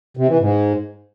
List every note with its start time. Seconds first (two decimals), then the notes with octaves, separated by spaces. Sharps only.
0.17 C3
0.29 E3
0.40 G#2